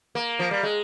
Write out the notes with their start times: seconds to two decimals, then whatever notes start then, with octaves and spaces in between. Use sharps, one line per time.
0.15 A#3
0.39 F3
0.51 G3
0.63 G#3